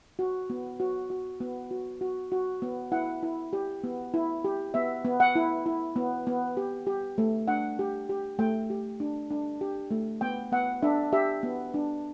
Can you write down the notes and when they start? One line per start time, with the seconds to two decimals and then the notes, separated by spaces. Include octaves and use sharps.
0.19 F#4
0.50 B3
0.80 F#4
1.10 F#4
1.40 B3
1.71 F#4
2.01 F#4
2.32 F#4
2.62 B3
2.92 E4 F#5
3.23 E4
3.53 G4
3.84 B3
4.14 E4
4.44 G4
4.74 B3 E5
5.05 B3
5.20 F#5
5.35 E4
5.66 E4
5.96 B3
6.27 B3
6.57 G4
6.87 G4
7.18 A3
7.48 D4 F#5
7.79 G4
8.09 G4
8.39 A3 G5
8.70 G4
9.00 D4
9.31 D4
9.61 G4
9.91 A3
10.21 B3 G5
10.52 B3 F#5
10.82 D4 E5
11.13 G4 E5
11.43 B3
11.74 D4